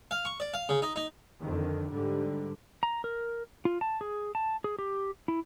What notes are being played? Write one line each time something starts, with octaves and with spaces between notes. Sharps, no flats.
F5
C#6
D5
F5
C#3
D#4
D#4
F2 D3 D#3
G#2 D3 G3
A#5
A#4
F4
A5
G#4
A5
G#4
G4
E4